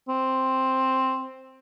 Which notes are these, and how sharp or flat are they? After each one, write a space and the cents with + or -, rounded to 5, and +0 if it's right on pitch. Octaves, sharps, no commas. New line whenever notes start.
C4 +5